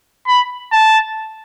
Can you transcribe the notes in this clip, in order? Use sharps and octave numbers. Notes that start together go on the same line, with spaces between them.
B5
A5